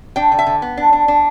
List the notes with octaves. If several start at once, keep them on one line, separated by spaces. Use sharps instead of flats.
D4 G5
D3
E5
D3
B3
D4
D4
D4